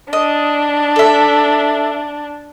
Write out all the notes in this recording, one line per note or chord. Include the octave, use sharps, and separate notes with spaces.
D4 D#5
A4 E5